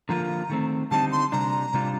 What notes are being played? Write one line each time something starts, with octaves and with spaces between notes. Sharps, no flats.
D3 F3 A#3 F4 A#5
D#3 A3 C4
D3 G3 C4 D#4 A5
C6
C3 G3 D4 A#5
C3 G3 D4 F4